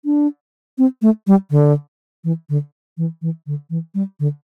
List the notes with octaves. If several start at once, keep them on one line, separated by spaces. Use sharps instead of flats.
D4
C4
A3
G3
D3
E3
D3
E3
E3
D3
E3
G3
D3